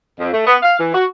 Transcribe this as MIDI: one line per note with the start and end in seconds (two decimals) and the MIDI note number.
0.20 0.33 41
0.34 0.47 57
0.47 0.56 59
0.63 0.77 77
0.80 0.94 52
0.94 1.05 66